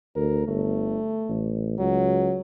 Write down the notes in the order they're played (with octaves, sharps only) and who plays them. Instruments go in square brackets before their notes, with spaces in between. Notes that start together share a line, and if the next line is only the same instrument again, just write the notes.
[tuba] D2 [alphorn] A#4
[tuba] G1 [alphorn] A3
[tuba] A1
[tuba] C#2 [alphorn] F#3